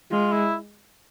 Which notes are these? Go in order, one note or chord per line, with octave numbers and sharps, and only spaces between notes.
G#3 F4
E4